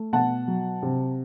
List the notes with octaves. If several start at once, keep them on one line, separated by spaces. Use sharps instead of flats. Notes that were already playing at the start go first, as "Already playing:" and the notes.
Already playing: A3
B2 F#5 A5
F#3
C3